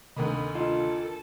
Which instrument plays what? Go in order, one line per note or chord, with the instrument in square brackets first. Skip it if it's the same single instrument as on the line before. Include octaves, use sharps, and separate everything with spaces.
[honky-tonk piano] D2 A#3 B5 [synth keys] C3 D#3 F#6 [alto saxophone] D#5
[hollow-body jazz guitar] F4 D#5 [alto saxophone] A4